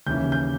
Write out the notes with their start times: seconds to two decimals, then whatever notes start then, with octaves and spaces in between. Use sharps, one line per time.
0.07 D#2 C#3 E3 G6
0.32 G6